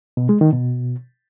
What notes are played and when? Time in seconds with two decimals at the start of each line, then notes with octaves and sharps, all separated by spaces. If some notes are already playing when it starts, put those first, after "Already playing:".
0.17 B2
0.29 G#3
0.41 D#3
0.53 B2